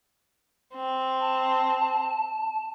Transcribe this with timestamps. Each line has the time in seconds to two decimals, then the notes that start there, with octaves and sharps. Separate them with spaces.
0.75 C4
1.20 A5